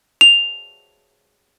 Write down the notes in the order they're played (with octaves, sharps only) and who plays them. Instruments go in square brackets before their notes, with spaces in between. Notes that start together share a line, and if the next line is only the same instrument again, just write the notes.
[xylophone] F7